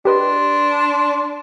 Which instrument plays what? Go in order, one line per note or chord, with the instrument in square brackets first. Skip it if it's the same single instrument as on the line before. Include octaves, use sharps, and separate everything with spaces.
[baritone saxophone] D4 [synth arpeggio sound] G4 B4 D#5 [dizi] C6